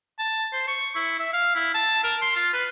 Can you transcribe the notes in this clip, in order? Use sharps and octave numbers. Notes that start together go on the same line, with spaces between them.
A5
C5
C#6
E4
E5
F5
E4
A5
A#4
C6
F4
B4